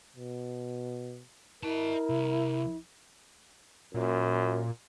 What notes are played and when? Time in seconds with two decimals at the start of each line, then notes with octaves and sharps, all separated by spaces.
0.16 B2
1.63 E4 A#4 D#5 A5
2.09 C2
3.94 F#2 A#2